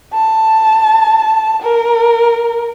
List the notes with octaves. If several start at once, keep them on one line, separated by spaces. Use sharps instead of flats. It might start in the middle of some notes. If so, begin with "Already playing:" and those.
A5
A#4